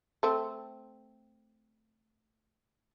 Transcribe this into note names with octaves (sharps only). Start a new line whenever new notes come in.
A3 C4